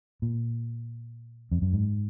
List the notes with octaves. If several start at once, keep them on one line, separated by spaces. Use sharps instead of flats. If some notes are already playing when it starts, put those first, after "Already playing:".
A#2
F2
F#2
G#2